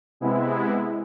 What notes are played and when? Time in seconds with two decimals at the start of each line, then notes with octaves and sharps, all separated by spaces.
0.20 C3 G#3 B3 E4